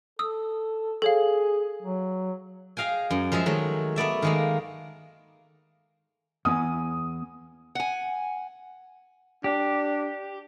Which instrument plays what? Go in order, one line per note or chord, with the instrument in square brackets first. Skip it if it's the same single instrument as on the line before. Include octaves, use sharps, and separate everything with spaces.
[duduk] A4 [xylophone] D#6 E6
[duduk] G#4 [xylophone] A4 C#5 F5
[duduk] F#3
[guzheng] G#4 D#5 F5 G5 G#5
F#2
F3 G#3 G#4 E5
D#3 F#3 G#3 A3
A3 B3 D5 E5
D#3 G#3 A#3
[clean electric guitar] E2 B3 G#5 [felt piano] D#6
[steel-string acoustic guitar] F#5 G#5
[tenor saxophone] D4 [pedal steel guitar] G4